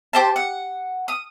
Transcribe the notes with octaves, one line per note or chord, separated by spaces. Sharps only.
G4 C5 A5
F#5
D#6